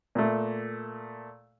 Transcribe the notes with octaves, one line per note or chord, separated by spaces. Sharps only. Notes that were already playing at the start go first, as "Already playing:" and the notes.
A#2 A3